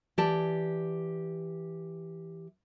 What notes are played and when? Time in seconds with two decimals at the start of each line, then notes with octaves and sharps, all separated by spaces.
0.18 E3 G4 D5 A5